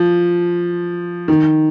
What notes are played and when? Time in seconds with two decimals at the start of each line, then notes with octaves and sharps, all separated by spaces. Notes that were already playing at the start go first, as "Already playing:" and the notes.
Already playing: F3
1.28 D#3